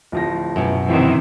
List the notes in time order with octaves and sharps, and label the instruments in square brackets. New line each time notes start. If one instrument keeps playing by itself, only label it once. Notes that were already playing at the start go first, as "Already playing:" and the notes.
[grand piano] D1 F3 A#6
[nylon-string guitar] F#2 B2
[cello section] C3 D#3 E3 [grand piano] C4 C#4 E4